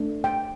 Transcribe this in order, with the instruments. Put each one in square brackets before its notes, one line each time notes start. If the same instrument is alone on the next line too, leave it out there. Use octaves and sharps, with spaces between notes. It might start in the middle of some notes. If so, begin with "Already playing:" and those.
Already playing: [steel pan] A3 D4
G5